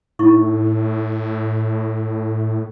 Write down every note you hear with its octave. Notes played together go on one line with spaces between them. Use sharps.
A2 D#4 E4 C#6